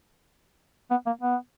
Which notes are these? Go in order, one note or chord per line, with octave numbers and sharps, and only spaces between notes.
B3
A#3
B3